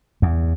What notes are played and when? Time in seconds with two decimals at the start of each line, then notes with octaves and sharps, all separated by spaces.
0.22 E2